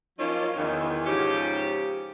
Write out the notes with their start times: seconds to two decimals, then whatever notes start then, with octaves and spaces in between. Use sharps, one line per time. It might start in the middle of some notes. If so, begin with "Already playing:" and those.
0.18 F3 F#3 A#3 C#4 D#4 F4
0.56 E2 D#3
1.06 G#2 C#3 F3 G4